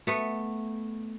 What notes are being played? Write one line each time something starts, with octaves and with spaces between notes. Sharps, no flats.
A3 B3